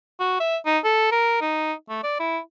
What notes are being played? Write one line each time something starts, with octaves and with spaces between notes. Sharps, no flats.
F#4
E5
D#4
A4
A#4
D#4
A3
D5
E4